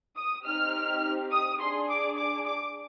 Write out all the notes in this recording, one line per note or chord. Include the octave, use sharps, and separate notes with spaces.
D#6
C4 D#4 G4 F6
D#6
D4 G#4 C6
D6
D6
D6